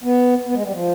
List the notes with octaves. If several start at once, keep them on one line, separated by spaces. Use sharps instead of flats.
B3
B3
G#3
G3
F3